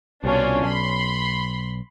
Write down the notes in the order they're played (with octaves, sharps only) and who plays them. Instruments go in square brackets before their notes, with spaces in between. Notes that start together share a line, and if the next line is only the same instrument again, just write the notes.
[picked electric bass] C2 B2 [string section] C#4 D4 F4
[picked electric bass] B1 [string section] B5 C6